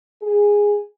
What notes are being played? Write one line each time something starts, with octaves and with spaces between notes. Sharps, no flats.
G#4